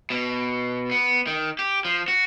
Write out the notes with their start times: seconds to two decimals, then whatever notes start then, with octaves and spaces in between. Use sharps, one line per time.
0.10 B2
0.91 B3
1.27 D#3
1.59 G4
1.85 F3
2.08 F#4